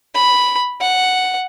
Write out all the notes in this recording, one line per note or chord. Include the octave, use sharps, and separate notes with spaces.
B5
F#5